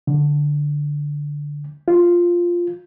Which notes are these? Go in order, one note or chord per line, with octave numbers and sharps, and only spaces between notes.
D3
F4